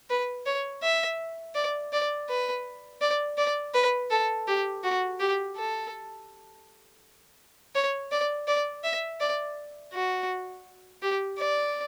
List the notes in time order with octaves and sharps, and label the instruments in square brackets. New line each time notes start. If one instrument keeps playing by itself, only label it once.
[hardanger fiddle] B4
C#5
E5
D5
D5
B4
D5
D5
B4
A4
G4
F#4
G4
A4
C#5
D5
D5
E5
D5
F#4
G4
D5